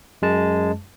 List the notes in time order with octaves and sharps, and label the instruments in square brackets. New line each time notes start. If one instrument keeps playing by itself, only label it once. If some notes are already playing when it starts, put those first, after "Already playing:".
[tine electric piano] F#2 G#3 A5